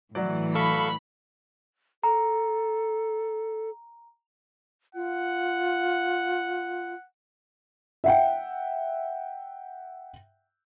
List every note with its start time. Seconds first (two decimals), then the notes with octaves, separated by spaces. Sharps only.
0.15 A2 E3 F#3 D5
0.55 A4 F5 B5 C#6
2.04 A4 A#5
4.95 F4 F#5
8.04 E5 F#5 G5